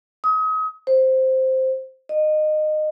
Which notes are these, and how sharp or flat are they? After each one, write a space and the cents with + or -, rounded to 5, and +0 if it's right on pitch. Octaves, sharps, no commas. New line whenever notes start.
D#6 +35
C5 +0
D#5 -20